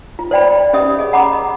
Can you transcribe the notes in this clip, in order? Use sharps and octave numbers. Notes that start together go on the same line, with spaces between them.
F4
C5 D5 G5 B5
C#4 G4 D#5 E5 D#6
G#4 D#5
F#5 A#5 B5 D6
D#5